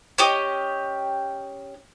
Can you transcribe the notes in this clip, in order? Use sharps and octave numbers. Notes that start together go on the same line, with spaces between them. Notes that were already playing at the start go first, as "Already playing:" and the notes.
C#4 G4 D#5